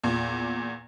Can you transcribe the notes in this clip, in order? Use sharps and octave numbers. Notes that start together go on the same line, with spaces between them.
E2 A#2